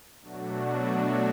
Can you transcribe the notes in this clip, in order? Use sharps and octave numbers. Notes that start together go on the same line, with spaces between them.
B2 F#3 A3 D4 F#4